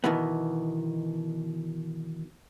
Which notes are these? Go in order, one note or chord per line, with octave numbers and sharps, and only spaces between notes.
B2 D#3 E3 B3